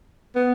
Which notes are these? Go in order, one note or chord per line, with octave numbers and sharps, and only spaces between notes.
B3